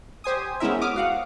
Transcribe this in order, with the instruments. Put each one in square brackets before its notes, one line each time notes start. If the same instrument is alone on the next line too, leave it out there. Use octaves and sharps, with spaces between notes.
[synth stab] G4 C5 G#5 D#6
G#3 B3 C#4 E4 A#4 E5
D6 D#6 F6
F#4 F5 F#5